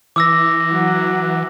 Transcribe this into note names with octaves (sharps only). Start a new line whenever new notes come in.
E3 D6 E6 A#6
F#3 F#5